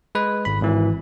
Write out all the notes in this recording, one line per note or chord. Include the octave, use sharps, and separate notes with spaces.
G#3 B4
G#1 B5
G#1 E3